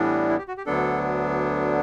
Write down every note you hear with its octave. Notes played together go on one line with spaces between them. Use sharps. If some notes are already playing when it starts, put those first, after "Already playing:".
Already playing: A2 E3 G3 B3 D4
E4
G4
F#4
G4
D2 D3 F#3 B3 D4 A4